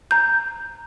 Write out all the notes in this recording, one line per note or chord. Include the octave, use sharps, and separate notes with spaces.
A#5 G6